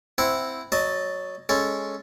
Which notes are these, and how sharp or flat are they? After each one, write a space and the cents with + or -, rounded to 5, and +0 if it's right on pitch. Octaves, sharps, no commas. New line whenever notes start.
C4 +0 E4 +0 F#5 -15
F#3 +0 D#5 -25 A5 +0
G#3 +0 C#4 +0 A4 +0